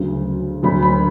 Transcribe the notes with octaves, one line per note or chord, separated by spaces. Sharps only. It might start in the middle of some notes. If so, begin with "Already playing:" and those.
Already playing: D2 C#3 F#3
D2 D3 F#3 B5
B5